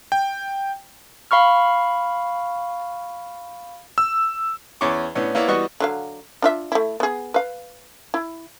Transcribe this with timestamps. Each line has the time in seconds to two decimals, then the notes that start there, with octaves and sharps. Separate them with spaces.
0.12 G5
1.31 F5 B5 C#6 F6
3.98 E6
4.81 E2 C#4 C#6 D6
5.15 A2 B3 C#4 D4
5.35 A#3 B3 E4 C#5 D5
5.48 E3 G3 B3 F#4 D#5 C#6
5.80 D3 F#3 F5
6.42 D4 F4 E5
6.72 A3 E4
7.00 B3 G#4
7.34 B4 F5
8.14 E4